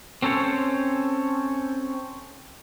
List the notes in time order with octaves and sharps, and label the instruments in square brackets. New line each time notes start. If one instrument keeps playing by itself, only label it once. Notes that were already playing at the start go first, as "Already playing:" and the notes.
[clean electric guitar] C4 C#4 A4 C5 C#5